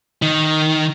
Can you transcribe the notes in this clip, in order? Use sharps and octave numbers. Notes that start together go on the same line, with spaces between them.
D#3